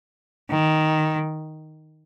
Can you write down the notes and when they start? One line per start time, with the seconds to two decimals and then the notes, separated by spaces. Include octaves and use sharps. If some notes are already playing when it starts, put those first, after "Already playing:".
0.51 D#3